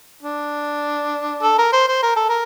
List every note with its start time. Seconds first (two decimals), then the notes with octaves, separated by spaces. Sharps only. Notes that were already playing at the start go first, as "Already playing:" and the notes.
0.23 D4
1.43 A4
1.58 A#4
1.72 C5
1.88 C5
2.03 A#4
2.16 A4
2.29 A#4